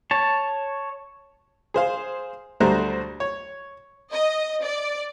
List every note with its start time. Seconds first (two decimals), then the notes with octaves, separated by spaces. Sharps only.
0.11 C#5 A5
1.74 G#4 C5 F5
2.60 D2 G3 A3 C5 A#5 F#6
3.20 C#5
4.13 D#5
4.63 D5